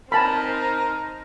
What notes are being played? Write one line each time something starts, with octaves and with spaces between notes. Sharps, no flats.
C4 D#4 A#4 G#5 A5 B5